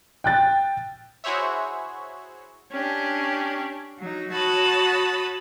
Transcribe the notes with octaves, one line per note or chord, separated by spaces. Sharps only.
G5 F#6 A6
E4 F#4 G#4 C5 C#5 E5
C#4 D4 G4
F#3 D#4
F#4 C#5 A5 B5 D#6